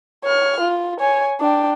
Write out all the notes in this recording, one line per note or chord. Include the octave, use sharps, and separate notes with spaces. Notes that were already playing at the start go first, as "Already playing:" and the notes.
C#5 F6
F4
C#5 G#5
D4 G5